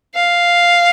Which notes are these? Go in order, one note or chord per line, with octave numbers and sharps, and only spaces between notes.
F5